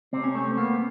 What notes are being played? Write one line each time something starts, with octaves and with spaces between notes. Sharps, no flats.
C3 C4
C#4
A3 C4
A#3 B3